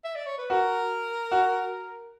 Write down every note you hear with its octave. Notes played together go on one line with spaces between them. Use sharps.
E5
D5
C#5
B4
F#4 A#4
F#4